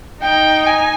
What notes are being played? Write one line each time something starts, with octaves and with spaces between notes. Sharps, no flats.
D#4 G5
G#5